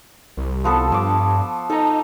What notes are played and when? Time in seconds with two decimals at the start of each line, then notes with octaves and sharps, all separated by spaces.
0.37 C2
0.64 F3 B3 A4
0.92 G2 F3 D6
1.70 D#4 A4 A#5